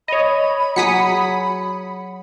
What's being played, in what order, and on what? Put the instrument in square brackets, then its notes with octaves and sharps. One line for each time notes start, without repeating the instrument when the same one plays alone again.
[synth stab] C#5 D#5 [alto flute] B5
[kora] F#3 G#4 [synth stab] D#6 B6 C#7